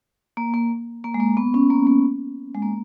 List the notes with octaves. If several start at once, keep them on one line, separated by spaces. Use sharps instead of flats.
A#3
A#3
A#3
G#3
A#3
B3
C#4
A#3
A#3
G#3
A#3